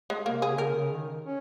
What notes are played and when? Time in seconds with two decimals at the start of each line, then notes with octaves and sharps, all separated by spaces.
0.10 G#3
0.26 C3 A#3
0.42 G#4
0.50 C#3
0.58 A#4
0.75 C#3
0.92 D#3
1.25 C#4